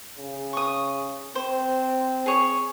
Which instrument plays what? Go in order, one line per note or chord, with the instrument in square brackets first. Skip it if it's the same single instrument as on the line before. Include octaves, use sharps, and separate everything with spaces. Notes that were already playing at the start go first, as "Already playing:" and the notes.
[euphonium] C#3
[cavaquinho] C#6 D#6
[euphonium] C4 [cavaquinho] C5
[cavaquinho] G#4 C#5